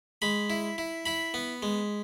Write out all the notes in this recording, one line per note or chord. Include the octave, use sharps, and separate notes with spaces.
G#3 B5
E4
E4
E4 B5
B3
G#3